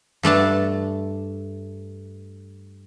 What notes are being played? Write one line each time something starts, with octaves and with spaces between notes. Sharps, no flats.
G2 A3 D4 A5